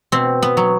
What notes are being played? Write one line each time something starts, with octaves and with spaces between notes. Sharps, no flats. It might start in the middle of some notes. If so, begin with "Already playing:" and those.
B2 C4
B3
F#3